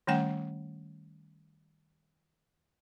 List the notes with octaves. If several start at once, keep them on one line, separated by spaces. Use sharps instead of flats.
D#3 G3 A3 C#4 F#5 G5